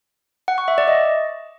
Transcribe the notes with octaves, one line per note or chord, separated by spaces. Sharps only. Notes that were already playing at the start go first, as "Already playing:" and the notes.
F#5
C#6
E5
D5
D#5